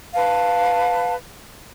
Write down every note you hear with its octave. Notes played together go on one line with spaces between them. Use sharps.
B4 F5 A5